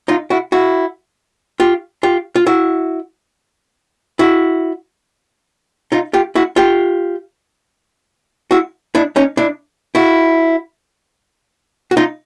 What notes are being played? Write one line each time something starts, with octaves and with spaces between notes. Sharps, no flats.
D#4 F4
E4 F#4
E4 F#4
F4 G4
F4 G4
F4
E4 F#4
E4 F#4
D#4 F4
F4 G4
E4 F#4
F4 G4
E4 F#4
D4 E4
C#4 D#4
D4 E4
E4 F#4
F#4
D#4 F4